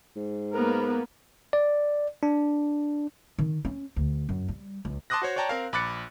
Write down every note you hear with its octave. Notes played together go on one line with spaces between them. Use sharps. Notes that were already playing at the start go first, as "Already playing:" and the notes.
G#2
A#3 B3 A#4
D5
D4
D#3
C#4
D2
F#2
G3
C#2
A5 C6 D6 D#6 F#6 A#6
F#4 C5 C#5
C#5 D5 G5 A5 A#5
C4 A#4 F5
A#1 B5 D6 F#6 A6 C#7